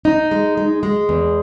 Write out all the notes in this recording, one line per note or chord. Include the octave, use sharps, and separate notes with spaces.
D#4
G#3
G#3
G#3
E2